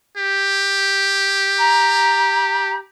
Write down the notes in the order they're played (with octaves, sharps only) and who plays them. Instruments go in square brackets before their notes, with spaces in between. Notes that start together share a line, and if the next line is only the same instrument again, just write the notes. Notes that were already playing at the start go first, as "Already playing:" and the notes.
[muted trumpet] G4
[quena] A#5